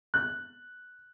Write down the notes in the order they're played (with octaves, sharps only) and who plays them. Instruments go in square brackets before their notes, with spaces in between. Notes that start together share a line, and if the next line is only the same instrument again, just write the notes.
[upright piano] F#6